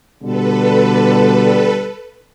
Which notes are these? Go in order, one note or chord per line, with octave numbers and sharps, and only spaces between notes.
B2 D3 G3 A4 B4